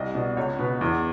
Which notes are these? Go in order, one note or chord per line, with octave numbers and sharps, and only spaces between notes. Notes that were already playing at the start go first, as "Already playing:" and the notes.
Already playing: C2 D#5
B2 D5
C#2 C#5
B2 B4
E2